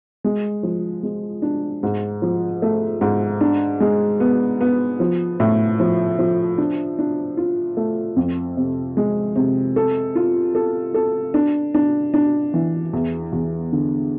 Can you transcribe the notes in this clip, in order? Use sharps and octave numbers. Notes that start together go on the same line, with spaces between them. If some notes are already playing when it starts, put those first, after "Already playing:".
G#3
F3
G#3
D4
G#2
F3
A3
G#2
D4
G#3
B3
B3
F3
A2
F3
F3
D4
D4
F4
A3
F2
C3
G#3
C3
A4
F4
A4
A4
D4
D4
D4
E3
E2
E2
D3